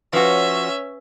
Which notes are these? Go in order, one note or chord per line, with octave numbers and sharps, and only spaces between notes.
F3 C#4 F#4 B4 C#5 E5